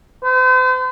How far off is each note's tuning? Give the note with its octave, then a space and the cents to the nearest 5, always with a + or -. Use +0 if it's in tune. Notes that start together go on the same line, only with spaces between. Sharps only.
C5 -40